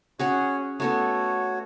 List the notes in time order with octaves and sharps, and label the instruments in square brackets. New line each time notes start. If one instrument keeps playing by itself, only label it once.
[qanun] C#4 F#4 G#4 [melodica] C#5 F#5
[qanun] A3 B3 A4 [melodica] F#4 C#5